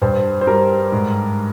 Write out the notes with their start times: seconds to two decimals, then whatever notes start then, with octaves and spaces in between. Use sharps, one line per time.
0.02 G2 C5
0.41 C5
0.47 G3 A#4
0.92 G#2